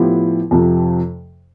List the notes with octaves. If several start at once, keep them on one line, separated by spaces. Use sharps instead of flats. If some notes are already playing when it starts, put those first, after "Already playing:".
Already playing: A2 F3 B3 E4 G4
F2 C3 F3